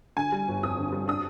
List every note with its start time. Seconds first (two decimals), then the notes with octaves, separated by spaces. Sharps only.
0.17 D3 G#5
0.32 G3
0.48 G1
0.63 F2 D#6
0.78 D3
0.92 G3
1.08 D4 D#6